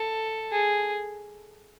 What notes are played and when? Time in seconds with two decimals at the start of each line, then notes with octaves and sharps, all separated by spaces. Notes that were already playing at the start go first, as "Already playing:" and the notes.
Already playing: A4
0.52 G#4